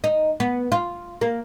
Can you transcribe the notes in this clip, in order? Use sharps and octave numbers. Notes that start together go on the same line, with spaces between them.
D#4
B3
F4
A#3